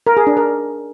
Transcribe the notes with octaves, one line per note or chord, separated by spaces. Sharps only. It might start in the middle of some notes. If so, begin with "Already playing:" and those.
A#4
G#4
D4
A#4